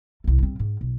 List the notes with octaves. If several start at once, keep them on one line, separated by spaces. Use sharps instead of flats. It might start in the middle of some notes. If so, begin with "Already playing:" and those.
C2 A3
G2 C4
G#2
B1